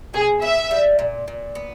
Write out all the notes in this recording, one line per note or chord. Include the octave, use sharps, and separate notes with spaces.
B2 G#4
B3 E5
G3
A#2
A#2
B3